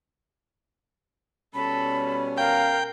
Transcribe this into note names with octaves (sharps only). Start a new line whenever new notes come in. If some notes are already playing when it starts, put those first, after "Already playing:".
B2 G3 C#4 A4 B5
A#4 F5 G5